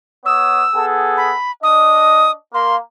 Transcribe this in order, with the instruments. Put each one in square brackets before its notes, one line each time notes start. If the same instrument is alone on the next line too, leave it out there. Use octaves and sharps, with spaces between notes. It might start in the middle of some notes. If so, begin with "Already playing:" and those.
[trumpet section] B3 C#5 D#6 [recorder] E6
[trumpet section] B3 G#4 A4
[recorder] B5
[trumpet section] D4 D#5 [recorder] D#6
[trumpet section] A#3 A#4 F5 [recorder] C6